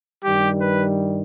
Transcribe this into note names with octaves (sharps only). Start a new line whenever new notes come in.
G2 D#3 G3 G4
B4